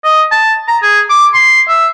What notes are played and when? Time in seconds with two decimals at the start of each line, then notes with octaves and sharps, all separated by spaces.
0.04 D#5
0.31 A5
0.68 A#5
0.83 G#4
1.10 D6
1.34 C6
1.68 E5